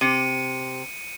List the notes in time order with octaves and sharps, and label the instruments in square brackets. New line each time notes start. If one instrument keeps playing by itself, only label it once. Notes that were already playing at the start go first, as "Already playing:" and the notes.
[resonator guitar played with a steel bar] C3 [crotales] C#7 D#7